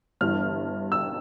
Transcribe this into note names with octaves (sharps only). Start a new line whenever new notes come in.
G1 G2 E3 F6
E6